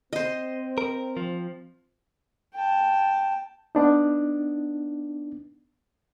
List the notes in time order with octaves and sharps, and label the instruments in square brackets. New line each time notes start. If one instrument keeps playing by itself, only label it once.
[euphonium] C4 [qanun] C5 D#5
[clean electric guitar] A#4
F3
[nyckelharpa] G5 A5
[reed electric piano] B3 D4 D#4